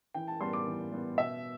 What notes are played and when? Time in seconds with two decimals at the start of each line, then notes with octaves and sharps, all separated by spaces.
0.14 E3 G5
0.28 A5
0.40 G3 B3 C6
0.53 D6
0.67 E3
0.92 G3 B3
1.18 B2 E5